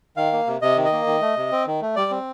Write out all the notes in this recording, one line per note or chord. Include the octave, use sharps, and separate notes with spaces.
D#3 F5
A#3
C3
C3 D#5
D#3
D#5
A#3
D#3
A3
C3
C4
D#3
A3
G3 D5
C4